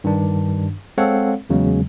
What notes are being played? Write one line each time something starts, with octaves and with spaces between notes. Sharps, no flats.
G2 D#3 D4
G#3 C4 A4 C#5 F5 F#5
E2 C#3 F#3 G#3